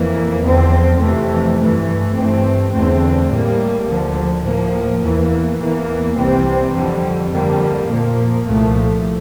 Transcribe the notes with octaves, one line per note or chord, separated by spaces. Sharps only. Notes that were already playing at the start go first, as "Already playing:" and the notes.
Already playing: F2 E3 A#3
E2 D3 F3 C4
F2 C3 E3 A3
G2 E3 A3
G2 E3 A3 C4
E2 D3 A3 C4
A2 G3 A#3
D2 D3 F3
A2 F3 A#3
E2 E3 A#3
E2 E3 A#3
C2 C3 E3 G3 C4
F2 D3 G3
F2 D3 G3 A#3
A#2 F3 A#3
C2 A#2 F3 A3